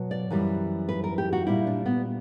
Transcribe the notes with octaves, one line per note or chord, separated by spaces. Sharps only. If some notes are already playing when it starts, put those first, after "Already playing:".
Already playing: B2 F#3
D5
F#2 E3 G3
B4
A#4
G4
F#4
A#2 G3 E4
D4
B3